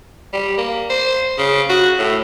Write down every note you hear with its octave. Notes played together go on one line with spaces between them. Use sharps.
G3
A#3
C5
C#3
F#4
A2